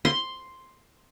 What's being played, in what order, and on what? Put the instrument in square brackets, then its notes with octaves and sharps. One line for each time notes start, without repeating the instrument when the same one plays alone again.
[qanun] C6